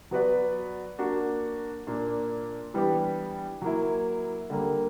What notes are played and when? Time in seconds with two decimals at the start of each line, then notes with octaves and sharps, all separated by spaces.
0.11 F#3 B3 F#4 B4 D5
0.98 A#3 D4 F#4
1.87 A#2 A#3 D4
2.74 E3 G3 B3 D4 G4
3.62 F#3 A#3 E4
4.50 D3 G3 A#3